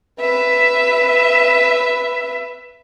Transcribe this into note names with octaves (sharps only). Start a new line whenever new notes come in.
B4 E5